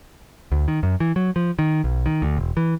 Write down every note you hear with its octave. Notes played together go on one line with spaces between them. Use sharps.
D2
D#3
F#2
E3
F#3
F3
D#3
B1
D#3
D2
E1
E3